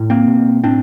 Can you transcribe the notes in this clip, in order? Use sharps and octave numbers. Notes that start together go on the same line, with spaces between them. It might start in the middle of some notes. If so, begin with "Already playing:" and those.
Already playing: A2
A#3 C4
B2
A2 C4 D4